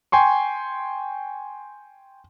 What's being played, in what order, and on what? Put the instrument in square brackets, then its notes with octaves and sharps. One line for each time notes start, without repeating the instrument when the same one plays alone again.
[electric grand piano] G5 G#5 C6 C#6